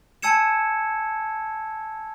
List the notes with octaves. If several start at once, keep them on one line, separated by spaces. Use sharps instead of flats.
G#5 A5 E6 G#6 C#7 E7